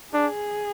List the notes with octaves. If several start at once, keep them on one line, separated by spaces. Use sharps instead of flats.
D4 G#4